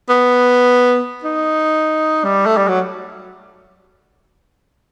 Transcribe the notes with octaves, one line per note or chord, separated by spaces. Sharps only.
B3
D#4
G3
A3
G3
F#3